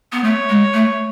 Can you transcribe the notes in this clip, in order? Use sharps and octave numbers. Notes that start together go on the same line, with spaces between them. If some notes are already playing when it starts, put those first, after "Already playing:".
B3
A3 C#5
G#3
A3